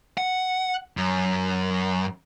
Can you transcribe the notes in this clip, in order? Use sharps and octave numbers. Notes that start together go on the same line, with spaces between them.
F#5
F#2